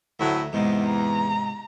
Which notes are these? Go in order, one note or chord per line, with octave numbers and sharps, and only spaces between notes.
D2 A2 F#3 E4
E2 G#2 C3 D#4
A#5